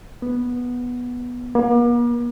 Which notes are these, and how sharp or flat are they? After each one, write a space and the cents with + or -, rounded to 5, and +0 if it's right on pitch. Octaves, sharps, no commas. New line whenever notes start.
B3 -10
A#3 +45